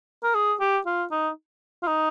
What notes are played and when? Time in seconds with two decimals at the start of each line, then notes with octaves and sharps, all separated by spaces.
0.24 A#4
0.35 G#4
0.60 G4
0.86 F4
1.11 D#4
1.83 F4
1.87 D#4